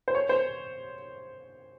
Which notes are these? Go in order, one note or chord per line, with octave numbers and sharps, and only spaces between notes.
C5
C#5
C5